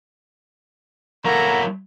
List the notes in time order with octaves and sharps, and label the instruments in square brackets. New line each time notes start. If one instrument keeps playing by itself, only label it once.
[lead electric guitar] F#3 E4 [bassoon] A#3 [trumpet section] A4 A#4 A#5 [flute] F#5